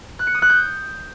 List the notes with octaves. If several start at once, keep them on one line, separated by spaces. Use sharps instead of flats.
F#6
C#7
D#6
F#6
G6